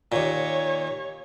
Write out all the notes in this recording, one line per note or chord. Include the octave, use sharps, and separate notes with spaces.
D#2 A#2 C#5